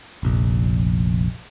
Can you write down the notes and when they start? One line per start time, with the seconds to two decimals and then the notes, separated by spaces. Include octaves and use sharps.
0.23 F1 A#1